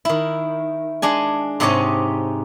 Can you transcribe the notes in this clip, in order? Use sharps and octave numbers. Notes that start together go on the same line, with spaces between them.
D#3 E4
G#3 D4 G#5
G#2 C3 D#4 G4 C#5 D#5